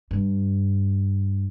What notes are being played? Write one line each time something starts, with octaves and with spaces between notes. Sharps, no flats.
G2